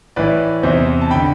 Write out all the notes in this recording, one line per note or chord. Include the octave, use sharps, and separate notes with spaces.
A2 E3 B4 D5
E2 C3 E3 C5 E5
A5
D3 G5 B5